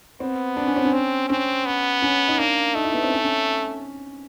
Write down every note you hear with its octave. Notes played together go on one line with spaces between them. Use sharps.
B3 C4
D4
C#4
C4
C#4
C4
C4 C#4
B3
C#4
D#4
A#3 D4
A3 D#4
E4
B3
C4
C#4
C#4